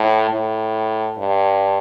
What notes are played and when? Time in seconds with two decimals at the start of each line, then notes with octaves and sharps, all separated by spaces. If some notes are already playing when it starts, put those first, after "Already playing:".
Already playing: A2
0.30 A2
1.19 G2